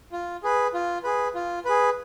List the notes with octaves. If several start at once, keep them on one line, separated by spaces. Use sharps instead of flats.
F4
G#4 B4
F4
G#4 B4
F4
G#4 B4